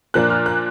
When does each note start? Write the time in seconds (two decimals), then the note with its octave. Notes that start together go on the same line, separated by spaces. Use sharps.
0.14 A#2 F3 A#3 D4 F#6
0.30 F6
0.46 F#6